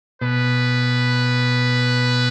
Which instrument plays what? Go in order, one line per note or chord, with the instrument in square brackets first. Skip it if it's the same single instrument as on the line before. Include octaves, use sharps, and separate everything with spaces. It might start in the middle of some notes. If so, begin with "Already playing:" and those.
[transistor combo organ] B2 [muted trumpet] B4